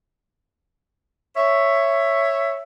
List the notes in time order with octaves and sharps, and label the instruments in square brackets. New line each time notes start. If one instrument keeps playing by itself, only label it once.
[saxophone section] C#5 E5